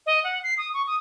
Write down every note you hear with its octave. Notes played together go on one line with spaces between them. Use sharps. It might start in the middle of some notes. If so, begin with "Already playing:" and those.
D#5
F#5
C7
D#6
C#6
D#6